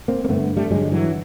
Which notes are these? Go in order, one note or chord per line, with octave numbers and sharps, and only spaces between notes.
A#3 C4
A#3
G2 D3 A3 B3
G3 A3
G2 D3 F#3 G#3
E3 F#3